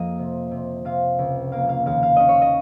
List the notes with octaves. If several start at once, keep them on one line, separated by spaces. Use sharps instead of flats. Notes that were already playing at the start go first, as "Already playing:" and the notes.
Already playing: F2 A#3 D#5 F5
C3
C3
C3 F5
C#2
A#3 F5
F5
D#2 F5
F5
C#4 D#5
C#5
D#5